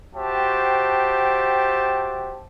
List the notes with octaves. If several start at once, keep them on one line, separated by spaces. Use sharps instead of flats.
F#4 G4 C5 E5 G5 A5